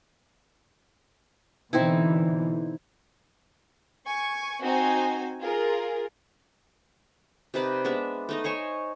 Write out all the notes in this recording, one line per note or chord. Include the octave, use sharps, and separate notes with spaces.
B2 D3 E3 C4 D#4 E4
G#5 C#6
C4 D#4 F#4 C5 G#5
F4 G#4 A#4
C3 D#4 B4 D5
G#3 B3 D4 E5
A3 D#4 D#5
C5 C#5 G#5 C#6